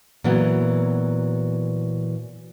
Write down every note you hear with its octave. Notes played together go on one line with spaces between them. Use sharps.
A#2 E3 F#3 B3